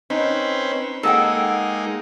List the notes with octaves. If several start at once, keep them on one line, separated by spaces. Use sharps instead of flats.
C4 C#4 D#4 B4
G#3 A#3 D#4 A4 F#5 G5